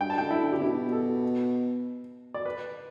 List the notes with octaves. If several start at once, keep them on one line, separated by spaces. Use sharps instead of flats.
G2 G5
A5
D3 G5
E4
D3
G4
D3
B2 E4
A4
D5
B4